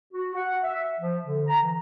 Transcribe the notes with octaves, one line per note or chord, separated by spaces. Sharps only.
F#4
F#5
E5
F3
D3
A#5
E3